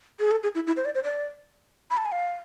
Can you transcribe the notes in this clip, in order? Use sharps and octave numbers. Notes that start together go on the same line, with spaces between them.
G#4
A4
G#4
E4
E4
C5
D5
C5
D5
B5
A5
G#5
F5